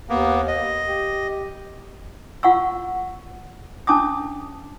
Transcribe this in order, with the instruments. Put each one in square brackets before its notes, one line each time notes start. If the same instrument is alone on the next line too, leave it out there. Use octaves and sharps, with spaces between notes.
[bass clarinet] D#2 [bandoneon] A#3 B3
[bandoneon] D#5
[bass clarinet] G4
[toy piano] F4 F#5 C#6 E6
C#4 D4 A5 D6 D#6